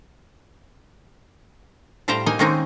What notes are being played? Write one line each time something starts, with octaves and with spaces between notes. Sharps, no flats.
A2 G3 C5 F5 G5 A#5
A#3 D#4 D#5 G#5
D#3 G#3 A#3 C4 C#4 D#4